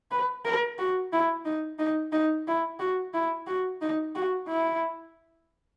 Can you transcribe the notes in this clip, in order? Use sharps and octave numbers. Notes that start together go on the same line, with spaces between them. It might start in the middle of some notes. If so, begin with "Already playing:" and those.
B4
A#4
F#4
E4
D#4
D#4
D#4
E4
F#4
E4
F#4
D#4
F#4
E4